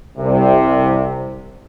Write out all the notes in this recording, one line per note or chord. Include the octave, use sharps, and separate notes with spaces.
C2 C3